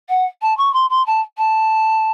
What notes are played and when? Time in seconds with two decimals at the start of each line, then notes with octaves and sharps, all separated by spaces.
0.09 F#5
0.42 A5
0.58 C#6
0.73 C6
0.90 C6
1.06 A5
1.38 A5